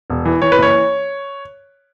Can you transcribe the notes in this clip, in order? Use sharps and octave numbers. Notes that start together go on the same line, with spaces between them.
E1
E3
E3 C#5
B4
F#1 C#5